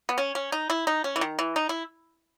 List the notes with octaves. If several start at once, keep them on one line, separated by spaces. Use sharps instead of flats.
B3
C#4
C#4
D#4
E4
D#4
C#4
E3
D#3
E3
D#4
E4